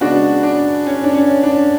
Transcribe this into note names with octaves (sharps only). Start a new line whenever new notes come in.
C#3 G#3 B3 D4 F#4
D4
C#4
D4
C#4
D4